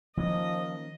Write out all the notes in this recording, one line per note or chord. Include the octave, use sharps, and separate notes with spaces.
D#3 F3 A#3 C#4 D#5